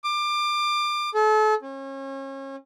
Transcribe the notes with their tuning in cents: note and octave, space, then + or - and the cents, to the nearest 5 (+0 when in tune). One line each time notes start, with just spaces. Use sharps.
D6 +25
A4 -35
C#4 -35